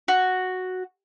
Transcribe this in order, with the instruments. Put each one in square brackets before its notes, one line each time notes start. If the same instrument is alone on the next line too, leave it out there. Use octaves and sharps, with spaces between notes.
[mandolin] F#4